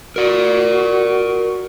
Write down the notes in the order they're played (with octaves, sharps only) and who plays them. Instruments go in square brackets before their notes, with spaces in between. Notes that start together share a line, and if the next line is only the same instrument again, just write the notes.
[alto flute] F#4 [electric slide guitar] A#4 D5